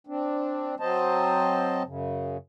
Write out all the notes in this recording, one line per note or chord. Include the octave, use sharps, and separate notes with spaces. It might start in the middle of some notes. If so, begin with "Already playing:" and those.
C4 D4
F#3 C4 C5 D#5 A5
F#2 C#3